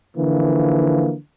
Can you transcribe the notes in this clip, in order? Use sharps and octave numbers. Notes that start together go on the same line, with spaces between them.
D3 E3 F3 A#3